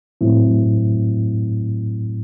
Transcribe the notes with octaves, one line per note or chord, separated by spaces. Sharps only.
A2 F#3 A3 C4 E4